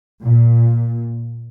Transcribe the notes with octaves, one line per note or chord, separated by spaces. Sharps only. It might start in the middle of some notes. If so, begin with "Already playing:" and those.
A#2